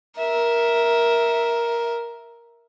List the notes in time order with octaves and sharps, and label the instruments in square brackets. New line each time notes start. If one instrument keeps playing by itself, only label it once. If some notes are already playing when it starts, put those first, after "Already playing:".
[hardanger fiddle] A#4 [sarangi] E5